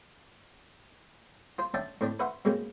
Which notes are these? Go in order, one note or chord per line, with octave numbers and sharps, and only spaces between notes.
F4 C5 C6
C#4 D4 E5 G5 A5
A2 C4 D4
B4 C5 E5 F#5 C6 C#6
B2 G#3 A#3 C4 C#4